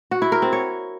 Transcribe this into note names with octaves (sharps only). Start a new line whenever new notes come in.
F#4
E4
A#4
C4
C#5